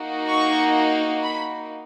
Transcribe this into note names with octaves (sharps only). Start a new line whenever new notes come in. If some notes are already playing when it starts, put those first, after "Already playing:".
Already playing: A#3 D#4 F#4
C#6
B5